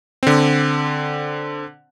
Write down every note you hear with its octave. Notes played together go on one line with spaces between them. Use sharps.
D3 C4